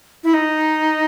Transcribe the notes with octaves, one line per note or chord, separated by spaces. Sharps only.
E4
D#4